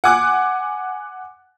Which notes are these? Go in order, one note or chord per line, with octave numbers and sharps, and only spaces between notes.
F#5 G#5 D6 F#6